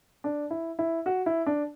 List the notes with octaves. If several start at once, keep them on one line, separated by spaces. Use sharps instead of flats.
D4
E4
E4
F#4
E4
D4